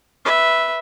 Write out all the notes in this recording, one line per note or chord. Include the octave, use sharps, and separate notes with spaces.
B4 E5